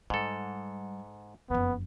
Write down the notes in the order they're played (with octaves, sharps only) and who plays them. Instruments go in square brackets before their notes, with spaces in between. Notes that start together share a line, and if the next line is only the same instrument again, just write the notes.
[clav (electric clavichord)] G#2 A4 [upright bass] G3
[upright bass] F#1 F2 [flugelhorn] B3